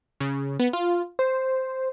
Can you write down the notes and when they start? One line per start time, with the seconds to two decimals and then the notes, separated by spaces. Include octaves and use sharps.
0.20 C#3
0.60 B3
0.73 F4
1.19 C5